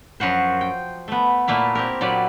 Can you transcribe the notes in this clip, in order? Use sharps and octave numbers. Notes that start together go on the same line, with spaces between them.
F#2 F3 F#4 C5
G5
A3 B3
A#2 A3 A#3 E4
C4 G4 A#4
A#2 F#3 D5 B5